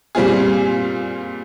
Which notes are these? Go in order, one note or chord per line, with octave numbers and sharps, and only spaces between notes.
A#2 G3 C4 F4 G#4